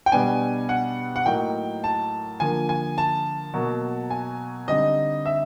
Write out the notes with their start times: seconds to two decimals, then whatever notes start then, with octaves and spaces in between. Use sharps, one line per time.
0.06 G5
0.12 B2 G3 B3 D4 G#5
0.69 F#5
1.16 F#5
1.26 A2 F#3 A#3 D#4 G5
1.84 A5
2.40 D3 F3 A#3 G#5
2.69 G#5
2.98 A5
3.54 B2 F#3 A#3
4.11 G#5
4.68 D3 G3 C4 D#4 D#5
5.26 E5